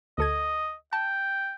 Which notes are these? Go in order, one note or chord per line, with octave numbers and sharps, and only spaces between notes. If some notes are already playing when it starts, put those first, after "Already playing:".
D2 A4 D#5 G#6
G5 A5